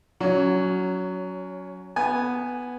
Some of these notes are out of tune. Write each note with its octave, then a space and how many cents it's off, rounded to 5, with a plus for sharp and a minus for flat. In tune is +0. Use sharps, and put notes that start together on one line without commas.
F#3 +0 C#4 +20
B3 +0 G#5 -5